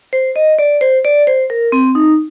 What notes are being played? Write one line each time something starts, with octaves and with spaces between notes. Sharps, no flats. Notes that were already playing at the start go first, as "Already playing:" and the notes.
C5
D#5
D5
C5
D5
C5
A#4
C4
D#4